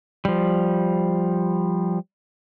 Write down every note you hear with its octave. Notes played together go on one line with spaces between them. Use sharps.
F3 G3